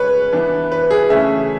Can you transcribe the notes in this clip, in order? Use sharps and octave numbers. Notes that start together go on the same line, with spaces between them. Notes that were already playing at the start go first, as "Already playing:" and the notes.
Already playing: C#3 G#3 C#4 B4 C#5
E3 B3 D4
B4
G#4
C#3 E3 A3 C#4 E5